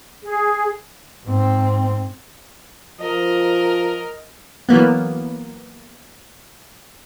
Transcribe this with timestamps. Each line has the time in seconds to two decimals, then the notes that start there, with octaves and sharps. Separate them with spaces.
0.23 G#4
1.26 G#2 C4
3.00 F3 A#4 D#5
4.69 E3 F#3 A#3 B3